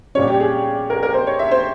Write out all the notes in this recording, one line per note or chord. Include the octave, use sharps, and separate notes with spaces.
A#2 G3 C#4 C#5
G4
G#4
A#4
A#4
C5
C#5
E5
C5